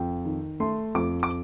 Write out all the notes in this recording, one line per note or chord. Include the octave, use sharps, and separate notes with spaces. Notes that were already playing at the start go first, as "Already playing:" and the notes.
Already playing: F2 G5
D#3
A3 C6
F2 D6
D6